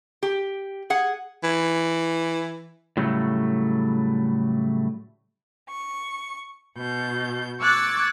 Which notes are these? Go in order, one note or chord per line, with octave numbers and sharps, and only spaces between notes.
G4
G#4 F#5
E3
A2 C#3 F#3 G3 A3
C#6
B2 G6
C#6 D6 E6 F#6 G#6 A6